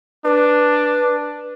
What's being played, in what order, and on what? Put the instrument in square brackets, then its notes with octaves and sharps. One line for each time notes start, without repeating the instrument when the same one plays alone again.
[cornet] D4 [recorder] B4